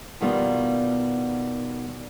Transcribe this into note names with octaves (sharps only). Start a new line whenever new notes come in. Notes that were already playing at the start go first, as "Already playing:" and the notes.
B2 D#3 G3 A#3 B3 F4